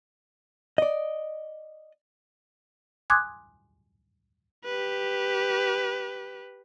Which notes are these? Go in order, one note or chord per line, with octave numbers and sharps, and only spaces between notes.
D5 D#5
G#5 C6 D6 D#6 F#6 G#6
G4 B4